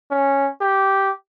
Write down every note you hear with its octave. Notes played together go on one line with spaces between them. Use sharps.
C#4
G4